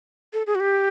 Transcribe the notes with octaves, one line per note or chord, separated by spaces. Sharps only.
A4
G#4
F#4
G4